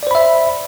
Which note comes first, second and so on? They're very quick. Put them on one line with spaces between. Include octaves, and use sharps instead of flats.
D5 C5 B5 E5